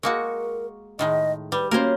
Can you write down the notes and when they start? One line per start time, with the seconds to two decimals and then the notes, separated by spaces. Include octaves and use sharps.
0.03 G#3 A#3 F#4 A#4 C#6
0.99 A2 D#3 G#3 D#5
1.52 G3 B4
1.71 A#3 C#4 F4 F#4 A#4 C5